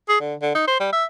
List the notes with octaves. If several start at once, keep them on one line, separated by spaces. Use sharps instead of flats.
G#4
D3
D3
D#4
C5
G3
E5